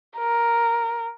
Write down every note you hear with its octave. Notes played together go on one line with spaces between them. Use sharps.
A#4